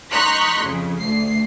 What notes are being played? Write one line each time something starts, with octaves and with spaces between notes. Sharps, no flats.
D#4 A#5 C6 C#6 F#6 B6
F2 C#3
D2 C7